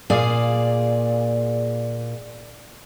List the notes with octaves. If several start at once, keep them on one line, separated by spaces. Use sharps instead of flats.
A#2 G#4 D5 F5